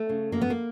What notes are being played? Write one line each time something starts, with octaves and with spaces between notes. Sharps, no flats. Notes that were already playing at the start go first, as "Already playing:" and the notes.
Already playing: A3
C#3
F#2 A#3
B3
A#3